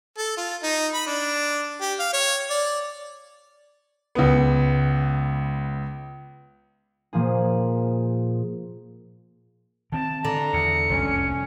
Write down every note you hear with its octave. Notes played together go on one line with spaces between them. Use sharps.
A4
F4
D#4
B5
D4
G4
F5
C#5
D5
C#2 B3
A#2 F3 A#3 G#4
D#3 C4 A5
D3 A#5
E2 C#7
F1 C2 F#2 C#4